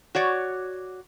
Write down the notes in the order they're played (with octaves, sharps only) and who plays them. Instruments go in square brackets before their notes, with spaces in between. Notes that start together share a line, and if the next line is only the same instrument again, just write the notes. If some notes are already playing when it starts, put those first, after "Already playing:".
[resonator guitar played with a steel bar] F#4 C#5 D5